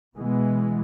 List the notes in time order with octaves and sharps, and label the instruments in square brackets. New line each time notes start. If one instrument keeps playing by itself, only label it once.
[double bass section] B2 E3 G#3 B3